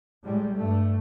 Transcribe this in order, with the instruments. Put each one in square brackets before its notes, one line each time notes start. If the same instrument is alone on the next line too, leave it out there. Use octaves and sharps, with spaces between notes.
[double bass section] A2 G3 G#3
G2 A3